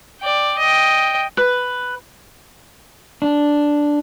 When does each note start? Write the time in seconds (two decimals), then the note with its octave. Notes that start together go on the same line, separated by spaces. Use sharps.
0.21 D5 G5
0.59 D#5 G5
1.37 B4
3.22 D4